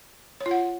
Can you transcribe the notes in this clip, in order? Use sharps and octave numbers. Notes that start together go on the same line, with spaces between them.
C#5
F4
F#5